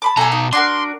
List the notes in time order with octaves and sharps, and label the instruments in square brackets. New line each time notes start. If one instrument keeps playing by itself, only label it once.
[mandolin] A5 B5 D6
[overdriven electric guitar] B2 A#5 [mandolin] A4 G#5
[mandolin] D#4
[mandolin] D4 F#4 A#4 [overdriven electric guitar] C6